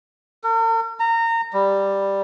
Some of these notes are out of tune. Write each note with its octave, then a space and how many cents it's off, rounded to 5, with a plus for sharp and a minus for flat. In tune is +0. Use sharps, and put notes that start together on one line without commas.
A#4 -45
A#5 -25
G3 +5